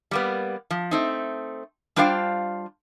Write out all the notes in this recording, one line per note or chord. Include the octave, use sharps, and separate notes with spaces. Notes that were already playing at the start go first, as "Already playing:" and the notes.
G3 A#3 B3
F3
A3 C4 D#4
G3 D4 F4 C5 F5 G5